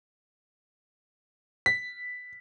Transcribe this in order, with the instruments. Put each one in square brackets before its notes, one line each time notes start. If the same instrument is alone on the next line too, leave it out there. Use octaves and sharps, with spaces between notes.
[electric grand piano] B6